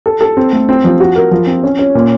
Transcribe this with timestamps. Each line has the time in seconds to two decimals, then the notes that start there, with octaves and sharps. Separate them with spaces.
0.06 A4
0.21 A4
0.37 C4
0.53 A3
0.69 C4
0.84 F3
1.00 F#4
1.16 A#4
1.31 F3
1.47 C4
1.64 C#4
1.79 C#4
1.95 A#2